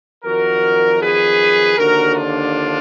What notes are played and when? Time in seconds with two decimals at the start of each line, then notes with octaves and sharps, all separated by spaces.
0.25 F2 D#3 F#3 F#4 A#4
1.00 G#4 B4
1.77 D#2 D3 F3 F#4 A#4
2.15 D4 F4